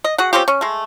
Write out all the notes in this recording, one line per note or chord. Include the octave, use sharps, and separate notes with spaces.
D#5
F#4 G#4 F#5
C4 C#4 F4 G4
C#4
G#3 A3